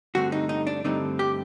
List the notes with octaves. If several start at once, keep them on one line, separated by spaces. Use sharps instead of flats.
G2 D3 A3 C4 F#4
D#4
D#4
D4
G2 D3 A3 C4 D#4
G4